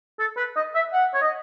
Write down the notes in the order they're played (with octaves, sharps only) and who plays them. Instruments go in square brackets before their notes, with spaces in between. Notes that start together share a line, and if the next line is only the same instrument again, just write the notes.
[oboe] A4
B4
D#5
E5
F#5
C#5
D#5